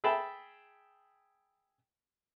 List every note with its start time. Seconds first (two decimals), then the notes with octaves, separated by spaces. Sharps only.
0.04 G#4 E5 G5 A5 B5